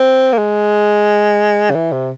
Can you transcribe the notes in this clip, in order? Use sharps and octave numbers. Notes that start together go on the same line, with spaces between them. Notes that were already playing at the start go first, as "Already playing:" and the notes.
Already playing: C4
A#3
G#3
C#3
E3
C3